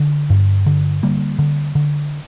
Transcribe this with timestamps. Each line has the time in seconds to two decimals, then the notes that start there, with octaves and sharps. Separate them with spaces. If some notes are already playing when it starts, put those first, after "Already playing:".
Already playing: D3
0.30 G2
0.66 D3
1.03 D3 G3 A#3
1.39 D3
1.75 D3